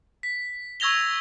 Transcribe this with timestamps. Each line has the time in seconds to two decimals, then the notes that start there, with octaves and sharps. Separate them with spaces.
0.23 B6
0.80 C#6 E6 G#6 A#6 F7 G7